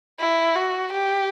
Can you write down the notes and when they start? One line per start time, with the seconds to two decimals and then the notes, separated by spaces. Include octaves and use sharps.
0.20 E4
0.56 F#4
0.93 G4